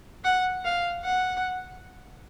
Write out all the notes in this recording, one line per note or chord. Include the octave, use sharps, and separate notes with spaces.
F#5
F5
F#5